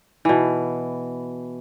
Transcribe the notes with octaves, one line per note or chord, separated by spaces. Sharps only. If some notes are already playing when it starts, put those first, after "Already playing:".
B2 E3